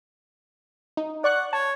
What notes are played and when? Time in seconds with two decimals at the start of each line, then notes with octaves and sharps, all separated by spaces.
0.97 D#4
1.24 D5 F#5 C#6 F#6
1.53 C#5 A5